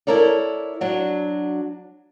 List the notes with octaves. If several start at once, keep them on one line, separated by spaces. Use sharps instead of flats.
E4 A4 A#4 C#5 D5
F#3 D4 F#4